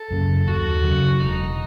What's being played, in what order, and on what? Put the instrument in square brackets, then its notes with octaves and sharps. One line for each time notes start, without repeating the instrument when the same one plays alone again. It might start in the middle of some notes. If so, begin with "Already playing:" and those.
Already playing: [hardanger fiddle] A4
[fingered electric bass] F#2 C#3
[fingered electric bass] D#2 [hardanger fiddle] F#4
[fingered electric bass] C#3 F#3
[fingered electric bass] E1 [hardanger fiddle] D#4